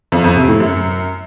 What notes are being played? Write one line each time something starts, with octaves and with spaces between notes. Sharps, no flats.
F2
F2
C3
A2
F#2